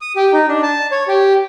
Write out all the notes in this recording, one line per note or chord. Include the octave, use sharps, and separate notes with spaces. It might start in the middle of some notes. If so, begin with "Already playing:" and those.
D#6
G4
D#4
D4
A5
C#5
G4